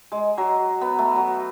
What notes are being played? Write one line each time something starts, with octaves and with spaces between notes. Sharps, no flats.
G#3
F#3
B3
A3
F#3